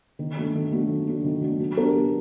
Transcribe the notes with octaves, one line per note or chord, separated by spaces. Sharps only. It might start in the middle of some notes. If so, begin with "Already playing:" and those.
D#3
F#3 A3 D4
D#3
F#3 A3 D4
D#3
F#3 A3 D4
D#3
F#3 A3 D4
F#3
B3 D4 G4 A#4
F#3